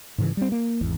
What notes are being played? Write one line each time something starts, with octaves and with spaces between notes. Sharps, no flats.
G#2 C#3 E3
G3 C4
A#3
G#1 E2